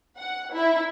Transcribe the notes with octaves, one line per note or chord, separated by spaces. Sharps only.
F#5
E4